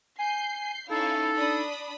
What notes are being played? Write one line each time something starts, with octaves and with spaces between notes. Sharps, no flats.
G#5 G6 C7
C#4 D#4 E4 A4 F5
D4 B5 D#6